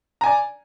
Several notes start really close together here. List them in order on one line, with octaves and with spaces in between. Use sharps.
A#5 G#5 D5